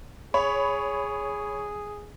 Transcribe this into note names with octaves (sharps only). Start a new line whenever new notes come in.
G#4 C#5 B5